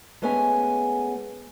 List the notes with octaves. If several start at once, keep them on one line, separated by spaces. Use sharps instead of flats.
G#3 A3 B3 C#4 G#4 G#5